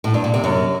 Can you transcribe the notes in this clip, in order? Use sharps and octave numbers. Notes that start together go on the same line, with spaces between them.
A2
G2
A#2
C3
F#2